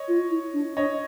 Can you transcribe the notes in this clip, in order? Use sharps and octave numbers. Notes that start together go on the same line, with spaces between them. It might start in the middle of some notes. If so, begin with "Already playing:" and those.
Already playing: C#5 D#5
F4
E4
D4
D4 C#5 D#5